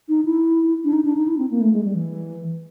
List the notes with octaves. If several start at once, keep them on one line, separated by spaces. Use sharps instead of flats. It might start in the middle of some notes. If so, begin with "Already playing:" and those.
D#4
E4
D4
D#4
D4
D#4
E4
C4
A#3
A3
G#3
G3
E3